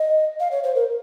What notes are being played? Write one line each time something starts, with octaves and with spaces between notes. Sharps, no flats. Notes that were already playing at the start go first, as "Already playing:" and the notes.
Already playing: D#5
F5
C#5
C5
A#4